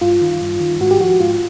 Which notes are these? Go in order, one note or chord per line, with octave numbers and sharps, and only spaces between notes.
G2 F4
D#3
G2
D#3
G#2 F#4
G4
F3 F#4
G#2 F4